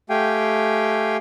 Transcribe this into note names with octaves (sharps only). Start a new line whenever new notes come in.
A3 G4 F5 G5 G#5